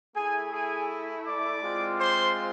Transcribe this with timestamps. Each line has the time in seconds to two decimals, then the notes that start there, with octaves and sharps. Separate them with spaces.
0.15 A3 E4 G#4 G#5
0.52 G#4 G#5
1.26 D5 D6
1.62 G#3 C4 F4
1.99 C5 C6